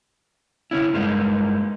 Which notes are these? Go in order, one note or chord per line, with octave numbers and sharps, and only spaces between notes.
C#3 C#4 E4
G2 G#3 A#3 D#4